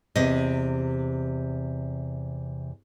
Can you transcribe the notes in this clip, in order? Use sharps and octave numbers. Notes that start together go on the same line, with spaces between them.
E2 C3 D#5